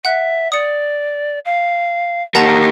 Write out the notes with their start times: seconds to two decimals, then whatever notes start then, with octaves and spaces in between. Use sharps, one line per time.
0.05 E5 F#5 F#6
0.52 D5 D#6 C#7
1.45 F5
2.35 A#3 G4 A#4 F#5 A5 A#5